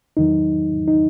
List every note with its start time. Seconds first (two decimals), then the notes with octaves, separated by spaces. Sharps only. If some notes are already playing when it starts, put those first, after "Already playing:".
0.17 E2 D#3 F#3 D#4
0.88 D#4